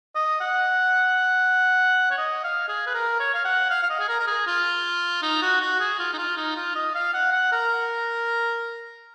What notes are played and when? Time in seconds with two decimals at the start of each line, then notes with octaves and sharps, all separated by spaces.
0.15 D#5
0.40 F#5
2.11 C#5
2.18 D#5
2.44 F5
2.68 G#4
2.87 B4
2.94 A#4
3.20 C#5
3.34 F5
3.45 F#5
3.70 F5
3.83 F5
3.90 D#5
4.00 G#4
4.09 A#4
4.20 A#4
4.27 G#4
4.47 F4
5.23 D#4
5.42 F#4
5.61 F#4
5.80 G#4
5.99 F4
6.13 D#4
6.18 F4
6.37 D#4
6.56 F4
6.76 D#5
6.95 F5
7.14 F#5
7.32 F#5
7.52 A#4